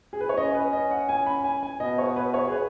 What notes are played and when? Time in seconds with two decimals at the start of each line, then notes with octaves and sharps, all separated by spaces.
0.13 G#4
0.21 B4
0.29 C#5
0.37 C#4 D#5
0.54 B4
0.73 D#5
0.91 F#5
1.09 G#5
1.26 B5
1.44 G#5
1.63 G#5
1.80 B2 D#5
1.98 C#5
2.16 B4
2.34 C#5
2.48 G#4
2.52 B4